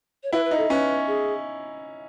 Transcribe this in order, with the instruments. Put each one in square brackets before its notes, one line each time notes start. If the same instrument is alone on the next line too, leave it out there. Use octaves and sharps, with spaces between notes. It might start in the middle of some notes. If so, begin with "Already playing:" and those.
[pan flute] C#5
[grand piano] E4 [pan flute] B4
[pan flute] B4
[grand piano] D#4
[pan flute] A4
[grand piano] C#4 [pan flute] B4
[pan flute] G#4